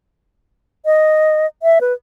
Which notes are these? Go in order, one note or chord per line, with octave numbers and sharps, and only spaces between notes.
D#5
E5
B4